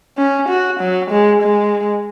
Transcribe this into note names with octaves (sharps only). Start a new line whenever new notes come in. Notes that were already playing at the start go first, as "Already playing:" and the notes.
C#4
F#4
F#3
G#3
G#3